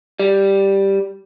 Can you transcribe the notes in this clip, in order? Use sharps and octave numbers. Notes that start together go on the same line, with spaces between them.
G3